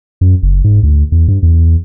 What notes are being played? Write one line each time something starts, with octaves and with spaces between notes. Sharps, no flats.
F#2
F#1
G#2
D2
E2
G2
E2